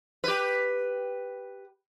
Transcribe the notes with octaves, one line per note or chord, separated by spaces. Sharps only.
G4 B4